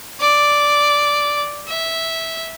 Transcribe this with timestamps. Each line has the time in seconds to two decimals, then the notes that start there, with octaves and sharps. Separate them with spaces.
0.20 D5
1.68 E5